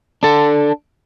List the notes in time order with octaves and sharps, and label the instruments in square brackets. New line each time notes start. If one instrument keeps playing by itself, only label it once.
[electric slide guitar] D4 A4